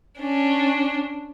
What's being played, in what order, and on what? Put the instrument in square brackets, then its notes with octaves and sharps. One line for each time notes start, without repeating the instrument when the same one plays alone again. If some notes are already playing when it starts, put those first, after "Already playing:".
[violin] C#4 D4